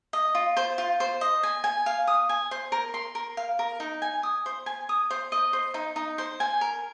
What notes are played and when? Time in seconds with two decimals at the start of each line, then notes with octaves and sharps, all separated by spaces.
0.13 D#5
0.35 F4
0.57 C5
0.78 F4
1.00 C5
1.21 D#5
1.43 G#5
1.64 G#5
1.86 F5
2.07 D#6
2.29 G#5
2.51 C5
2.72 A#4
2.94 C6
3.15 A#4
3.37 F5
3.59 A#4
3.80 D#4
4.02 G#5
4.23 D#6
4.46 C5
4.66 G#5
4.89 D#6
5.11 C5
5.32 D#5
5.53 C5
5.74 D#4
5.96 D#4
6.18 C5
6.40 G#5
6.61 A#4